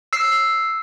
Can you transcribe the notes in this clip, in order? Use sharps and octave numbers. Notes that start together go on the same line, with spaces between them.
E6 C7